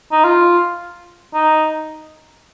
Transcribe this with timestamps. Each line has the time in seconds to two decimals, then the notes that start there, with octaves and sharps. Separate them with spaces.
0.12 D#4
0.24 F4
1.34 D#4